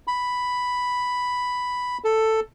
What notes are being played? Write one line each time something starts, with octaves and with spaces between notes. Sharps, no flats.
B5
A4